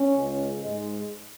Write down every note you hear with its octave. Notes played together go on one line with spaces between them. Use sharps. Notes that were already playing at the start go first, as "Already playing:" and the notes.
Already playing: C#4
C#2 C#3 G#3
G#2 G#3